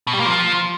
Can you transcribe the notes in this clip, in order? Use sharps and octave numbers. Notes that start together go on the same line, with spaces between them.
B2
G3
A#3
F3